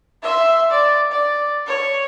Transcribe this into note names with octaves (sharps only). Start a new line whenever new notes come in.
E5 C6
D5
D5
C#5